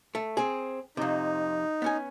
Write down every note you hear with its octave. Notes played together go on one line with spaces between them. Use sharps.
A3
C4 G#4
F2 C3 D#4
B3 C#4 G#5